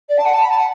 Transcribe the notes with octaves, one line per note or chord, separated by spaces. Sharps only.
D5
A5
F#5
A5
B5
A5
F#5